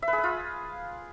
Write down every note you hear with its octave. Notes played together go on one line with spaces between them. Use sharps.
E5
B4
G#4
B4
F4